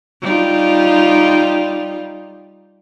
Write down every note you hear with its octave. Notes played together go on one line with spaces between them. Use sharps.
G3 D#4 F4